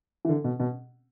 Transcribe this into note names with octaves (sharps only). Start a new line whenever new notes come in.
E3
D3
B2
B2